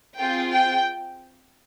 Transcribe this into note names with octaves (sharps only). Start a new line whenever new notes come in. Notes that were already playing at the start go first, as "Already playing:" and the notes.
C4 F4 G#4 G5
G5